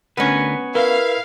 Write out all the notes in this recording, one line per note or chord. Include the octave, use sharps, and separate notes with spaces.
D2 B3 C#4 A#4 B4
E4 A#4 B4 F5